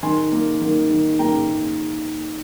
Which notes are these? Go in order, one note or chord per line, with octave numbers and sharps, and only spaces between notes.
D#3 G#5 C6
A#3
D#3
D#3
A#3 G5 A#5